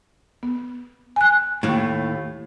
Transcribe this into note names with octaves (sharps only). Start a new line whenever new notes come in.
B3
G#5 F#6
D#2 A2